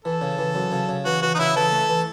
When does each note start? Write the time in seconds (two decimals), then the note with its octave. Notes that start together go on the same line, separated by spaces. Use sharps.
0.05 E3 A4
0.21 C#3
0.38 E3
0.55 F#2
0.72 C#3
0.89 C#3
1.05 E3 F#4
1.22 E3 F#4
1.35 D#4
1.39 C#3 E4
1.56 E3 A4
1.72 A3
1.89 E3